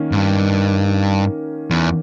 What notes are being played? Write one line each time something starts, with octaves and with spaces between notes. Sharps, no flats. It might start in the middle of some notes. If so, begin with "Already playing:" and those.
Already playing: D#3 A#3 C#4
G#2
G2
E2